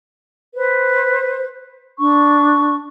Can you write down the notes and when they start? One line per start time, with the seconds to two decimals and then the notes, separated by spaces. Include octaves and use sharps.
0.55 B4 C5
1.99 D4 C#6